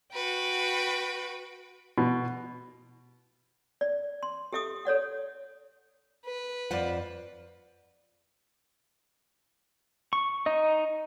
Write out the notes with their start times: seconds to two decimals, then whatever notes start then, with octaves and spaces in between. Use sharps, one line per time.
0.12 F#4 B4 G5
1.98 B2
3.81 D5
4.23 C6
4.53 G4 A4 E5 D6 D#6
4.85 A4 C#5 D5 F#5
6.25 B4
6.71 F2 F4 C5 D5 F#5
10.13 C#6
10.46 D#4 D#5